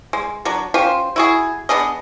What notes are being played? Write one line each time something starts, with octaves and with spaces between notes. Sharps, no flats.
G#3
F#3 D4
C#4 F4 G4 C5
E4 F#4 G#4
B3 D4 G#4 D#5